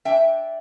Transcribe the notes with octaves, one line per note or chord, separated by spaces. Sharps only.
D4 E5 G5